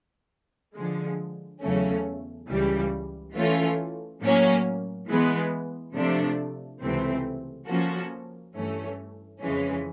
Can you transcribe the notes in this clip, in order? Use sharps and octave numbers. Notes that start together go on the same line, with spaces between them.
D3 F3 G#3
E2 C#3 F#3 A3 C#4
C#2 C#3 E3 G3
E3 A3 C#4 F4
A2 F#3 A#3 C#4
E3 G#3 B3
C3 F3 A3 D4
C#2 C3 E3 A3 C4
F3 A#3 C#4 F#4 A4
G2 E3 A3 C#4
F2 C#3 E3 G#3 C#4